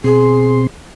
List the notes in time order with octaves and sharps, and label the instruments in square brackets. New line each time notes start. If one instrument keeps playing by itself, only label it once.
[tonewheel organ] B2 C4 C6 [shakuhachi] G#4